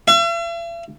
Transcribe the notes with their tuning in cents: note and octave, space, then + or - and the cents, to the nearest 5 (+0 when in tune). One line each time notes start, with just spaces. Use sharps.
E5 +45